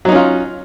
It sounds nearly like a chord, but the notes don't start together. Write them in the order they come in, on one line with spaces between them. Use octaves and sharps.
F#3 D#4 C#4 F4